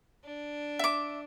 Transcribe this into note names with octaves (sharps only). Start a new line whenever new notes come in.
D4
E5 D6